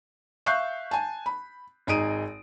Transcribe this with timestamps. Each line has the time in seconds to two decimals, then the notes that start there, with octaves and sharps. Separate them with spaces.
0.46 E5 F5 C#6 F#6 G6 C7
0.91 G#5 A5
1.26 B5
1.87 G#1 D#4 G#4 D#6 D7 D#7